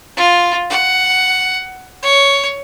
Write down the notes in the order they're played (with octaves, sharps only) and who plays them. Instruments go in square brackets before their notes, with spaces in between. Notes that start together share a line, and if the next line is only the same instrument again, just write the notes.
[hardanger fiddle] F4
F#5
C#5